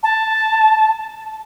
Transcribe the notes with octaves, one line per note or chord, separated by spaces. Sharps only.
A5